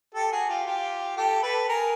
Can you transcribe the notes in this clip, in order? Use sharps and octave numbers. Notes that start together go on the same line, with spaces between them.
G4 A4
F#4 G#4
F4 G4
F4 G4
G4 A4
A4 B4
G#4 A#4